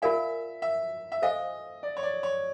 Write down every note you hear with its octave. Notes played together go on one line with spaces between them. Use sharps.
F4 A#4 D5 E5 F5 G#5
E5
E5
A4 C5 D#5 F5 G#5
D5
C#5
D5
C#5